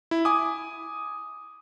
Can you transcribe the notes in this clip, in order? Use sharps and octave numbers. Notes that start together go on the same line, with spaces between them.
E4
G#5 D6 D#6